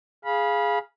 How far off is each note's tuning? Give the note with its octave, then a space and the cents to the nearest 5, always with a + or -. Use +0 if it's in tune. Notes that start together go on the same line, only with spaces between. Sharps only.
G#4 +0 F5 +0 B5 -25